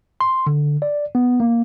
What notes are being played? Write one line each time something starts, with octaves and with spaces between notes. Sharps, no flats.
C6
D3
D5
B3
A#3